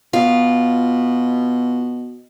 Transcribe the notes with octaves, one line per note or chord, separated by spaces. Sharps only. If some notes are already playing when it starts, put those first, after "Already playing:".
B2 F4